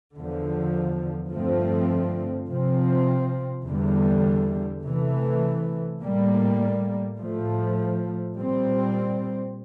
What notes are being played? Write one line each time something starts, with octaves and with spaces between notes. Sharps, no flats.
E2 D3 F3
G2 D3 F3 A3 C4
C3 F3 C4
E2 D3 G3
C3 E3 A3
A2 G3 A#3
A2 F3 A3
A#2 G3 C4